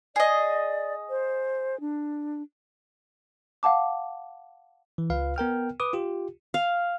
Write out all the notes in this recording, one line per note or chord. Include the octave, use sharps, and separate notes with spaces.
G#4 D5 D#5
C5
D4
F5 F#5 A5 D6
E3
C#2 F4 B4 F5
B3 A#4 G5 F6
B4 D6 D#6
F4 G4
F5